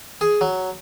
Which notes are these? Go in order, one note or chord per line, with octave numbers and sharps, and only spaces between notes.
G#4
F#3